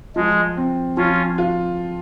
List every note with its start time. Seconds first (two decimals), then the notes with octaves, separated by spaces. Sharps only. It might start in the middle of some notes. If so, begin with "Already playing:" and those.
0.16 F3 G#3
0.57 C4
0.97 F3 C#4 F4
1.38 F4